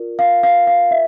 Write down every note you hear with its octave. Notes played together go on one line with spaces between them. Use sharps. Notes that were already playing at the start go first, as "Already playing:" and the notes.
Already playing: F4 A#4 D5
F5
F5
F5
E5